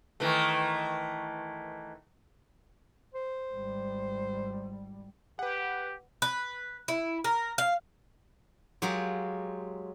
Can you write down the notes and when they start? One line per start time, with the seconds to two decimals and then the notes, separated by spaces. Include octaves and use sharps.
0.20 D#3 E3 A3
3.14 C5
3.52 G#1 G3
5.39 G4 B4 F#5
6.22 B4
6.88 E4
7.24 A#4
7.58 F5
8.82 F#3 G#3 F4 G4 A#4